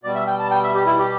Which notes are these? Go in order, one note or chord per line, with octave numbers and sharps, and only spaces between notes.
B2 G3 D5
E5
G5
A5
G5
E5
G4
E4
G4